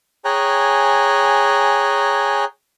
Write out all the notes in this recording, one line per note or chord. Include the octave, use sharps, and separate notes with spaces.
G#4 C#5 G5 G#5 A#5 F#6